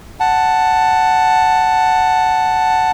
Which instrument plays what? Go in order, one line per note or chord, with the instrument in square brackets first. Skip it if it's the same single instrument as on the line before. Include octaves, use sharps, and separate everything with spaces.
[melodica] F#5 A5